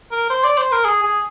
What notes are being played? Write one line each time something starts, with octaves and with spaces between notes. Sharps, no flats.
A#4
C5
D5
C5
A#4
G#4
G#4